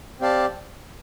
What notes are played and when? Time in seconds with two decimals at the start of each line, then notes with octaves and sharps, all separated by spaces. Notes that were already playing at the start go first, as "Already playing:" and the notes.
0.20 C4 G4 D5 F5 A5